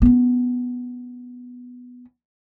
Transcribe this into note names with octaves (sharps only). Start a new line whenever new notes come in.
B3 C#4